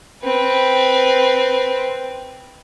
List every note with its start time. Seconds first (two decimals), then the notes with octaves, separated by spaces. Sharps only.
0.24 C4 B4